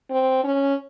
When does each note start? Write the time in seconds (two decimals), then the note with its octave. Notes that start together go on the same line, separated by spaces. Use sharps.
0.10 C4
0.44 C#4